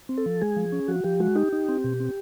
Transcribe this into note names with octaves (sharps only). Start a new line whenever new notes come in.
C4
A4
F3
G#3 G#4
F3
C#4
F3 F#4
F3 G4
G#3 F#4
D#4 G4
D#4
C4
B2
C4